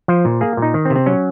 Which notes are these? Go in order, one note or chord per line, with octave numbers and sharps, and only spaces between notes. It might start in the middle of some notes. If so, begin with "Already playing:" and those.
F3 C5
A#2
A#3 G#4
A#2 D#4
D#3
C4
C3
C4
F#3 C#4